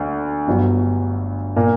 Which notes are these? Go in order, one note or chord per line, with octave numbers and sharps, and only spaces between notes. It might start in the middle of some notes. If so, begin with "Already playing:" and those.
Already playing: D2 D3
G1 G2 F#3
A#2 A#3